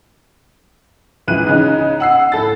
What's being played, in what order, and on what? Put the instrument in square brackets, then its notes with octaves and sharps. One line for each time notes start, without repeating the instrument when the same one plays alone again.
[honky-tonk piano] C#2 E3 F#6 D#7
C#3 D#4
F#5 E6 C7
A2 A4 A6